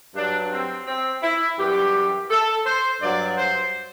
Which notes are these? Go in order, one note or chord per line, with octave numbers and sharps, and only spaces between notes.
G2 F#3 D4
C4
C4
E4
F#2 E3 G3 G4
A4
C5
G2 F#3 D5
C5